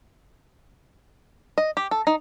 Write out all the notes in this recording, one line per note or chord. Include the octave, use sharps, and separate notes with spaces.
D#5
G4
A4
D#4